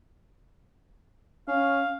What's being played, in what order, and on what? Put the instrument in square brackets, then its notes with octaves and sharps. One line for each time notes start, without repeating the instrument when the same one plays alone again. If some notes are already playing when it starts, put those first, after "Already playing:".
[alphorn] C#4 [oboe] F5